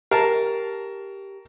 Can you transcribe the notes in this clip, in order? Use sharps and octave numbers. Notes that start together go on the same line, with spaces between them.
G4 A#4 A5